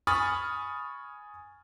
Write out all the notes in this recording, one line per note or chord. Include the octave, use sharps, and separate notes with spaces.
G#5 B5 C#6 D#6 F6 A6